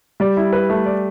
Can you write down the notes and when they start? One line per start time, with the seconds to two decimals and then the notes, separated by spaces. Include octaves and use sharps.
0.20 G3 D5
0.37 E4
0.53 B4
0.70 A3
0.86 D5